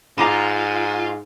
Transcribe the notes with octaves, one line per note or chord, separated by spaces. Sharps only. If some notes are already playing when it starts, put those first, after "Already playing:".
G#2 F4 A#5 B5 D6 D#6 A#6 D#7